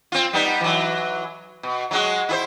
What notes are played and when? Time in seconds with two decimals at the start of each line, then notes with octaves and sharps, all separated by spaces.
0.12 C4 F4
0.33 G3 B3 D#4
0.61 E3 F#3
1.63 B2
1.91 F#3 G#3 F#4
2.29 E4 G#4 C5